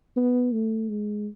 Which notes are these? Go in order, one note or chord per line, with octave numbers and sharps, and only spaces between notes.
B3
A3
G#3